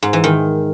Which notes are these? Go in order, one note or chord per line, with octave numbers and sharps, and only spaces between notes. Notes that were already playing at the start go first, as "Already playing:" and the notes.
G#2
E3
D#3